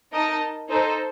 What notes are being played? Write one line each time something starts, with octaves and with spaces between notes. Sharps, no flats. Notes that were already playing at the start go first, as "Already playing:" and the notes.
D#4 A#4 D#5 A5
D#4 A4 C5